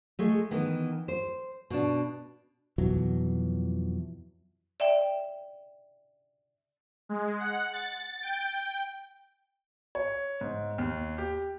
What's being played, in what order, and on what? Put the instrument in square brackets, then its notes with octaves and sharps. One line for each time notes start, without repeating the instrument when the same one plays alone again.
[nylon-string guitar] G#3 A3
D#3 E3 B3
C5
B2 D4
[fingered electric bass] F2 B2 E3 F#3
[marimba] D5 E5 G5
[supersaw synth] G#3
F#5
A6
G5
[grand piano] C#5
G#2
D#2
G4